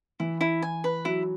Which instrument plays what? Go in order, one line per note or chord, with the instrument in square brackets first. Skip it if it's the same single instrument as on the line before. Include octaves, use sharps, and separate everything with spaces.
[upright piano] E3 [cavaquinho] E4
[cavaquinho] E4
G#5
B4
[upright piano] F#3 [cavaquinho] E4